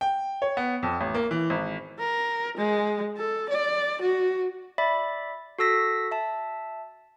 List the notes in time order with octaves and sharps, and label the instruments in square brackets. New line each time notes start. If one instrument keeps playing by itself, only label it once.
[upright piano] G5
C#5
B3
F2
A1
A#3
E3
G#1
[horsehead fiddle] A#4
G#3
A4
D5
F#4
[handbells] D5 E5 B5
F#4 A4 E6 A#6 B6
E5 A5